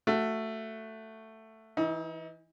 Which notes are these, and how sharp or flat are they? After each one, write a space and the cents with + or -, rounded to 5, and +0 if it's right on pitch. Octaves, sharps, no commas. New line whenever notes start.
A3 +10 F#4 +0
E3 -5 D#4 +35